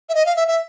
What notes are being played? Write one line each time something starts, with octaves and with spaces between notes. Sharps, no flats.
E5
D#5
F5
E5
E5